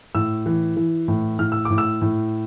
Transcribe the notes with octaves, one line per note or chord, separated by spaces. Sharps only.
A2 E6
E3
E3
A2
A2 F6
E6
D6
A2
E6
A2